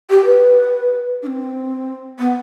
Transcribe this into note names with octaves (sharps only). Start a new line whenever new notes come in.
G4
B4
D4
C4
B3